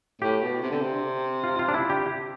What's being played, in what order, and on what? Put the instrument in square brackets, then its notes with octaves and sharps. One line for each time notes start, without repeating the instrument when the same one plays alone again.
[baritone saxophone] A2 [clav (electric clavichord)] G4
[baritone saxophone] B2
C3
D3
C3
[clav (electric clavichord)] F4
F4
D4
E4
G4